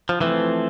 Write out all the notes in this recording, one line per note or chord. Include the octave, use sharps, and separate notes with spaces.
F3
E3 F3 A3 C4